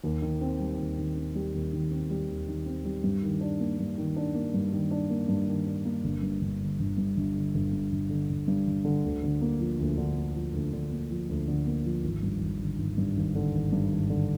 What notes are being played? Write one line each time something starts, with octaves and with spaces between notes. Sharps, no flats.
D#2
D#3
C4
G3
D#2
D#3
C4
G3
D#2
D#3
C4
G3
D#2
D#3
C4
G3
G2
D#3
D4
A#3
G2
D#3
D4
A#3
G2
D#3
D4
A#3
G2
D#3
D4
A#3
G1
G2
G1
D3
G1
G2
G1
D3
G1
G2
G1
D3
G1
G2
G1
D3
D2
D3
A#3
F3
D2
D3
A#3
F3
D2
D3
A#3
F3
D2
D3
A#3
F3
G#1
G2
G#1
D3
G#1
G2
G#1
D3
G#1
G2
G#1
D3